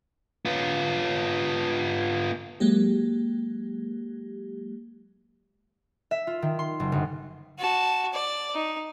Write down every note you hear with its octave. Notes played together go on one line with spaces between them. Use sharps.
B3 F4
F#3 G#3 A#3 G4
E5
F4
D#3
C6
F#1
G1
F#4 A5
D5
D#4